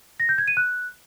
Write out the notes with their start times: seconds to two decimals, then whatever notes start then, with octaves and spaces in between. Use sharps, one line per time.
0.20 A#6
0.29 G6
0.38 G#6
0.48 D#7
0.57 F#6